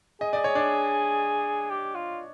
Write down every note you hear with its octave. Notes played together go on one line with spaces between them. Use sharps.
G#4 D#5
D5
C#5
D4 D5
G4
F4